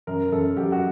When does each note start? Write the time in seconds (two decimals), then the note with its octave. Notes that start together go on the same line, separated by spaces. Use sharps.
0.07 F#2 A#4
0.32 F#2 A4
0.57 F#3 G4
0.72 F#4